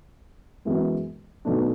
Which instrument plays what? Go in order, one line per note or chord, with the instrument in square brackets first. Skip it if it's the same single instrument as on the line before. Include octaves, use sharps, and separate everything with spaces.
[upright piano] F#2 E3 G#3 B3 F#4
B1 B2 A3 D4